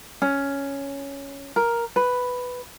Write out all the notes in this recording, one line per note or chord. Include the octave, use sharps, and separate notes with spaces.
C#4
A#4
B4